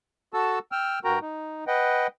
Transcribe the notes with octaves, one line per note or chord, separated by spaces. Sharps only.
F#4 A4 A5 E6
G5 E6 F6
G2 F#4 A#4 G5 A#5
D#4
B4 D#5 F#5 G5